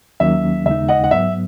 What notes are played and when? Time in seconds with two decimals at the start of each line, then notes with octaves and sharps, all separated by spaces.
0.20 D#2 D#3 F#3 A#3 C#4 E5
0.66 D#2 C#3 G#3 B3 D#4 E5
0.88 D#5 F#5
1.04 F#5
1.11 G#2 F#3 B3 E5